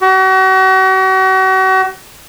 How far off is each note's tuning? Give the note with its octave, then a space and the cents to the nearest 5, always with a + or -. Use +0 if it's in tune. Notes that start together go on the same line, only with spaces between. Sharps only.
F#4 +40